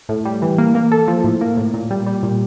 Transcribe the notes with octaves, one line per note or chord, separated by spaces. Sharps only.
A2
G3
E3
A#3
A#3
A4
F3
A2
A#3
A2
A#2
G3
G3
A#2